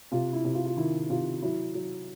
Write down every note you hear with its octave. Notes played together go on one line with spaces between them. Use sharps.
C3 F4
E4
C3
F4
F4
D#3 E4
C3 F4
F#3 E4
F#3